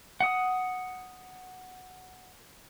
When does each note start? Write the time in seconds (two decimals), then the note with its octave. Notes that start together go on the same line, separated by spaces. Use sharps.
0.21 F#5 D#6